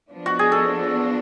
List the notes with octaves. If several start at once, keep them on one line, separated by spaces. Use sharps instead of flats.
F3 B3 D4
F#4
G#4
A4